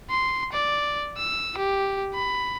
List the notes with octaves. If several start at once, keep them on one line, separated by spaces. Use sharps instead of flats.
C6
D5
E6
G4
B5